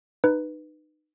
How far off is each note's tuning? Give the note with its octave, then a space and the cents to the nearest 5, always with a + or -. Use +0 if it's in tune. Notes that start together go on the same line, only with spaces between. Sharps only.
D#4 -25 B4 +0